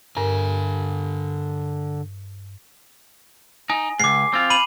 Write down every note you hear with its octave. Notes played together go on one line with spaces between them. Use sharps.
G2 D3 A#4 G#5
D#4 G#5
C#2 G#2 D6 C7
C4 F4
B5 D#7 F#7